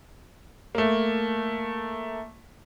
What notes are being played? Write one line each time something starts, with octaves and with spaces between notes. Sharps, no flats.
A3 A#3